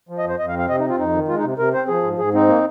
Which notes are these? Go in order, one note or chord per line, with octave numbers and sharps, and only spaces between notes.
F3
D#5
F2 C5
F2 D#5
F5
C4
F5
C3 D#5
D#4
C4
F4
F2 D#4
D#3
G#3 F4
D#4
C3
C3 A#4
C4 C5
F3 G#4
G#2
G#2 G#4
C4 D#4
A#3